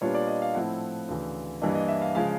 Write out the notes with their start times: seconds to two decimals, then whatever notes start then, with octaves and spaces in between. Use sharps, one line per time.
0.01 A#2 G3 B3 D4 F4 C#5
0.14 D5
0.28 D#5
0.42 F5
0.55 A2 F3 A3 C4 E4 F#5
1.08 D2 C#3 E3
1.62 G2 E3 G3 A#3 D4 D#5
1.75 D#5
1.88 E5
2.02 F5
2.15 C#3 F3 G#3 F5